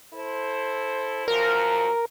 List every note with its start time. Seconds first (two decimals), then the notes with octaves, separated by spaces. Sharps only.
0.14 E4 A4 C5
1.28 F#2 F3 A#4